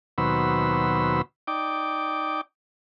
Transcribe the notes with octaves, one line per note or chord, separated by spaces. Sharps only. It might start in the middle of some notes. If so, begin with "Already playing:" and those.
D#2 B2 F#3 C5 B5 E6
D#4 D5 G5 D6